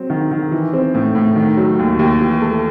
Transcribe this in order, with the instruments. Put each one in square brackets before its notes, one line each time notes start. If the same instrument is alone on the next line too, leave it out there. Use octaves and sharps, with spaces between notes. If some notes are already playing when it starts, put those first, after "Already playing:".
Already playing: [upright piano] F#3 C4
D#3
D#3
E3
C4
A2
A2
D#3
F#3
D#2
D#2
E3
A3